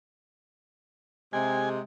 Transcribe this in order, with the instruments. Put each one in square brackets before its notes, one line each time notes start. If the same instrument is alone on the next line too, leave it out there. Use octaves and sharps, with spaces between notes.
[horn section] C3 G#3 [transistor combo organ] G#5